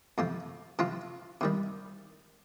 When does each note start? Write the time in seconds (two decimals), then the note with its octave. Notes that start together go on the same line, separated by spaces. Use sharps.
0.18 F2 C3 F3
0.79 C3 F3 C4 F4
1.41 C3 D#3 G3